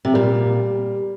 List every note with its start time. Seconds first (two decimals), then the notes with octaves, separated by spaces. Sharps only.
0.05 C3
0.14 A#2 G3